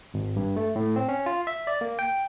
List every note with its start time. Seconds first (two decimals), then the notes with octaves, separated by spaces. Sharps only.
0.14 G#1
0.36 G2
0.56 A3
0.76 A2
0.96 C4
1.08 C#4
1.26 F4
1.47 E5
1.67 D5
1.81 A#3
1.99 G5